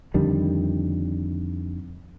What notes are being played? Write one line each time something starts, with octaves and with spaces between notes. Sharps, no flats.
F2 D3 D#3 G3